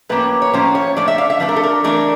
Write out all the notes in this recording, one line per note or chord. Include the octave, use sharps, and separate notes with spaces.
A2 F3 A#3 C#4 B4
C#5
A2 F3 A#3 C#4 C5
C#5
F3 A3 D4 D5
E5
F5
E5
F3 A3 D4 B4
A#4
A4
A#4
E3 A3 D4 A#4